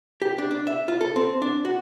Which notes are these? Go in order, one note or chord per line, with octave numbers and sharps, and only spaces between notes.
G4
D4
D4
E5
F4
A4
C4
D4
F#4